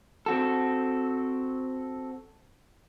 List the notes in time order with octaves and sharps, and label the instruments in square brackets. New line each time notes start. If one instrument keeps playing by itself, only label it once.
[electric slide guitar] C4 F#4 A4